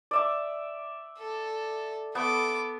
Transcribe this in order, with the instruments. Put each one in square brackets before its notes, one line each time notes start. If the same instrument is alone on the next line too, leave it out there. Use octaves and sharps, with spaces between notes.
[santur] D5 E5 D6
[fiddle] A4
[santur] B3 [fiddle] A4 D6